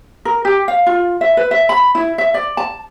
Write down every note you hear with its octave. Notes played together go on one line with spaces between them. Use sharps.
A#4
G4
F5
F4
E5
B4
E5
B5
E4
E5
D5
A5